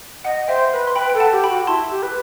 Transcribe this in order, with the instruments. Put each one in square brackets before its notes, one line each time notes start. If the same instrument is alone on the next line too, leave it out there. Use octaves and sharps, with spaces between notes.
[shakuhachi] D#5 [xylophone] F#5
[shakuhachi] C5 [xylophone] E5 G5
[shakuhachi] B4
[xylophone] C6
[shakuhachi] B4 [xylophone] G5 B5
[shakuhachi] A4 [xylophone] G5
[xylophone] F#5 A5
[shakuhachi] G4
[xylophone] G5 B5
[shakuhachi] F#4
[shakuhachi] E4 [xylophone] A5 C6
[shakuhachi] G4
B4